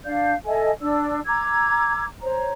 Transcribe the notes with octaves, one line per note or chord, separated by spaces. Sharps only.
D4 D5 F5 G6
A4 D#5 E5 G#5
D4 D5 E6
A#5 D6 E6 G#6
C5 C#5 A#5